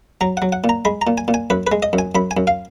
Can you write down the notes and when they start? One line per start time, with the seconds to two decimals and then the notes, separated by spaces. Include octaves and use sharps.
0.21 F#3 A#5
0.37 F#3 F#5
0.52 F#5
0.64 A#2
0.69 A#5
0.85 G#3 B5
1.02 A#5
1.07 A#2
1.18 G#5
1.28 A#2
1.34 G#5
1.50 F#2 B4
1.67 G#3 B4
1.83 D#5
1.93 F#2
1.98 G#5
2.15 F#2 B5
2.31 G#5
2.37 F#2
2.47 F5